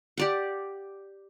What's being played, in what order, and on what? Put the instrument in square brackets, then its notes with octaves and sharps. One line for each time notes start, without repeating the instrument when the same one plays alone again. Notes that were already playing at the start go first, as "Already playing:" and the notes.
[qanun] G4 D5 F#5